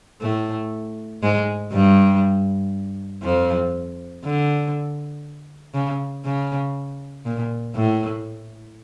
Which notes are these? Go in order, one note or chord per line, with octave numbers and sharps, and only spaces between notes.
A2 A3
G#2 G#3
G2 G3
F2 F3
D3
C#3
C#3
A#2
A2